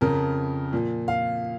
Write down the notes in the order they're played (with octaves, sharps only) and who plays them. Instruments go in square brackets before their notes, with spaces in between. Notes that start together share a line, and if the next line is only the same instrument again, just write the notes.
[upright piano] F2 C#3 F3 A#4
A#2 F3
F5